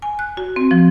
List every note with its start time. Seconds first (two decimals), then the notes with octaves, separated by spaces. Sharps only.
0.02 G#5
0.19 F#6
0.37 F#4
0.56 C4
0.71 F3